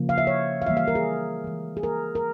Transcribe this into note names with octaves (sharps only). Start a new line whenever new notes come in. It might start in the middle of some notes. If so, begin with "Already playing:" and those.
Already playing: C#3 F3 A#3
F5
E5
C#5
F5
E3 G3 A#3 E5
F5
A#4
G#4
E3 G#3
G#4
A#4
A#4